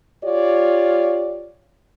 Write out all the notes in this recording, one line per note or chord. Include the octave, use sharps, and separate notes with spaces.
F4 G4 C#5 D5